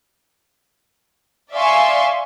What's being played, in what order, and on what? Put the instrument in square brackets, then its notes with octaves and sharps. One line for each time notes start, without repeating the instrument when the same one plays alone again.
[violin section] D5 E5 F5 G#5 C6 C#6